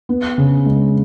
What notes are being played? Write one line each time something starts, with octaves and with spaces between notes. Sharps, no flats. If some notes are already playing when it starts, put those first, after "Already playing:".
B3
C#3
G#3